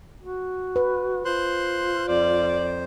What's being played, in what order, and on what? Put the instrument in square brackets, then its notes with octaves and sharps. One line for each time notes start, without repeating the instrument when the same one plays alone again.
[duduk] F#4
[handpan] B4
[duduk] F4 [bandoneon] C5 C6 F#6
[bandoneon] F2 C5 [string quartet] D5